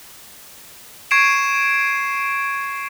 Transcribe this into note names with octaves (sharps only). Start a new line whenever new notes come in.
C#6 G#6 C7 D7 E7